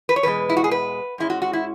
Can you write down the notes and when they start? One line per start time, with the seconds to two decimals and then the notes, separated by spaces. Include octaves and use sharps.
0.09 B4
0.16 C#5
0.23 E2 B2 G#3 B4
0.49 E4
0.57 F#4
0.64 G#4
0.71 B4
1.18 G#2 G#3 C#4 E4
1.30 F#4
1.42 F#4
1.53 E4